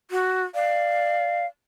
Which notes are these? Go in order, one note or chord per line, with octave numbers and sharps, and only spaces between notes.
F#4
D5 F5